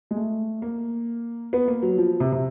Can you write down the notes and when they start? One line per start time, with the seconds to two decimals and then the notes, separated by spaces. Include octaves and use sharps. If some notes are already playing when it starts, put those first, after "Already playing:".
0.11 G#3
0.16 A3
0.62 A#3
1.53 B3
1.68 A#3
1.82 F#3
1.98 F3
2.20 C3
2.32 C3